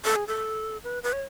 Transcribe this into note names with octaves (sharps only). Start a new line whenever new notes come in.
A4
G#4
A4
B4
B4
C#5